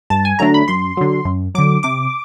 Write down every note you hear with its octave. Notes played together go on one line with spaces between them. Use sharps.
G2 A5
G#5
D3 F#3 A3 D4 A#5
B5
F#2 C6
D3 F#3
F#2
D3 F#3 D6
C3 D6